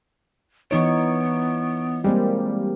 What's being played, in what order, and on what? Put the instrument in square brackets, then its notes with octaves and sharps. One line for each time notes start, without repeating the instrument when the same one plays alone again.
[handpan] E3 D#4 C#5 [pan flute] B3 [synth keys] C#6 D7
[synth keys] G3 G#3 [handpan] A#3 C4 G4